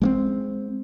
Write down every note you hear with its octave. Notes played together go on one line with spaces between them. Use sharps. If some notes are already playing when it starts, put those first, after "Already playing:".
G#3 A#3 C4